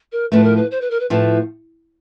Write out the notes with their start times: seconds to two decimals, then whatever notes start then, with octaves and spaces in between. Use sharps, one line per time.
0.12 A#4
0.31 A2 F3 A3 B4
0.43 A#4
0.56 B4
0.71 C5
0.81 B4
0.90 A#4
0.99 B4
1.10 A2 F3 A3 B4